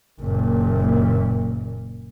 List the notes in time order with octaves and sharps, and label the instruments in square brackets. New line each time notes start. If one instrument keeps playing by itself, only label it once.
[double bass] F#1 A#2